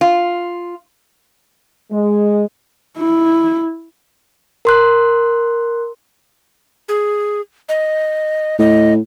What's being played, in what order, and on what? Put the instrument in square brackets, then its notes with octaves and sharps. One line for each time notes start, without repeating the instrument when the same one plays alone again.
[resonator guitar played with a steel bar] F4
[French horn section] G#3
[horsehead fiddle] E4
[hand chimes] A#4 C6 F#6
[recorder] G#4
D#5
[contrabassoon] A2 [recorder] D#5